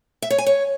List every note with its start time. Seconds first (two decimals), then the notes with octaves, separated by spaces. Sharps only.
0.22 E5
0.30 C#5
0.38 G#5
0.46 C#5